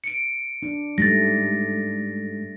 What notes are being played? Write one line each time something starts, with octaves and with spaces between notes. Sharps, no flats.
C#7 D7
D4
G#2 G3 A3 A6 A#6